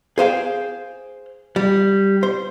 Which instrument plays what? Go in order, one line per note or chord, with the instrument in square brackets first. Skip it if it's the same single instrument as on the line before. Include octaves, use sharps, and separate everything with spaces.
[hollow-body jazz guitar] G#4 C5 F5 G5
G3
C5